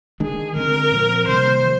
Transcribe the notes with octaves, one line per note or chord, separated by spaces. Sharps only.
D#3 G#3 D4 G#4
D3 G#3 C4 A#4
A#2 F3 C4
C3 D#3 G3 A#3 C5
F3